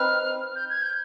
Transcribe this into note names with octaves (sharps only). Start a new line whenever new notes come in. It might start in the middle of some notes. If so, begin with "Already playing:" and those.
Already playing: C4 D#4 B4 F6
G6
G#6
G6